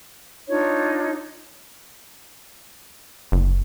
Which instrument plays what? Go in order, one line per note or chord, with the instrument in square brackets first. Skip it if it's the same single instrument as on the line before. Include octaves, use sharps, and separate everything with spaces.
[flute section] D4 D#4 F4 C#5
[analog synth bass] F#1